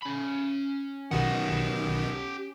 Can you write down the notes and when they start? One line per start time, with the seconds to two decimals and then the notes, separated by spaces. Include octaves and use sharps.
0.02 C#4 B5
1.11 B1 B2 D#3 G4 F#5